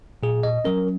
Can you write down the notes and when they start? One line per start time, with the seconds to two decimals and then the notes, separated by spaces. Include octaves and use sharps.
0.23 A#2 G#4
0.43 D#5
0.65 F#3 C#4 A#4